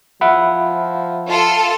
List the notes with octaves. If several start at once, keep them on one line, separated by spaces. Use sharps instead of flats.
F3 E5 F#5 B5
F4 A4